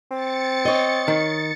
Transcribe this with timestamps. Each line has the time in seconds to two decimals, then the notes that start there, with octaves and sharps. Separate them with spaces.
0.11 C4 A6 C#7
0.65 C#5 D#5
1.08 D#3